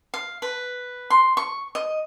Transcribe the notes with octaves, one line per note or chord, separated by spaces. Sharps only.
F5
B4
C6
C#6
D#5